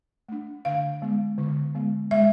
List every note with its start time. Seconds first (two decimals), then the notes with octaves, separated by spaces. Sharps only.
0.29 A3 D4
0.65 D3 F5
1.02 G#3 B3
1.38 D3
1.74 G#3 B3
2.11 G#3 E5